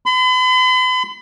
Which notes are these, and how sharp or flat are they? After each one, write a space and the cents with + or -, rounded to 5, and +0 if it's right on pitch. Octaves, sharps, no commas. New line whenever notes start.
B5 +45